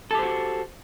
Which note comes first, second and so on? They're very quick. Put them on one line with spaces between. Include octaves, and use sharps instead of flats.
A4 G4 C5 F#4